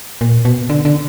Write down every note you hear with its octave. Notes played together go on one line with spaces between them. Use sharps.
A#2
B2
D3
D3